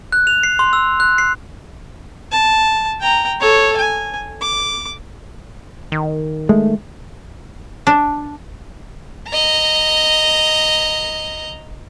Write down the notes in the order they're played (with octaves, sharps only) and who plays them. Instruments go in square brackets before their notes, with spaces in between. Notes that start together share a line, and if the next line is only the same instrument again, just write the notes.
[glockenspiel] F#6
F7
C7
C6
E6
F#6
C7
[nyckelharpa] A5
G5 A#5
A4 C#5
G#5
D6
[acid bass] D#3
[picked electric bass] G#3 [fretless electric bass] A3
[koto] D4
[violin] D#5 A#5